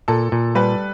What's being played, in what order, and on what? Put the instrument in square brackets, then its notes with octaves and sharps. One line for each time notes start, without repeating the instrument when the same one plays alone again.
[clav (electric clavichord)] A#2 [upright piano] A4
[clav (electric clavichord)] A#2
[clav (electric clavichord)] G3 [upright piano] B4